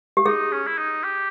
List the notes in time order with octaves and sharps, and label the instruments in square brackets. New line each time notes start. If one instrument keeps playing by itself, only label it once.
[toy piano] G4
[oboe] D#4 [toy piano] G#4
[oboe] C#4
E4
D#4
G4